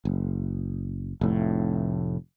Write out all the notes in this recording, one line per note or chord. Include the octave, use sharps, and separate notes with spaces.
F#1
F1 A2